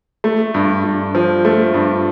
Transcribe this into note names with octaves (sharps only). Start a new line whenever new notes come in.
A3
G2
G2
F3
A3
G2